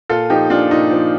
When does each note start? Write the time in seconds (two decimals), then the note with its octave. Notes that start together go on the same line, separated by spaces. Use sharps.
0.09 A#2 F4 A4
0.30 F3 D#4 G4
0.50 A#2 D4 F4
0.71 A#2 D#4
0.91 F3